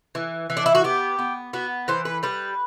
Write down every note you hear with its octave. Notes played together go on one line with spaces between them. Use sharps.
E3
E3
D4
E4
F#4
B3 G4
B3
B3 F#4
E3 C5
B4
G3 B4